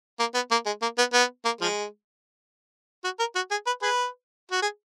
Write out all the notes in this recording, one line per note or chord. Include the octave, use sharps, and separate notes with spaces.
A#3
B3
A#3
G#3
A#3
B3
B3
A#3
F3 G#3
F#4
A#4
F#4
G#4
B4
G#4 B4
F#4
G#4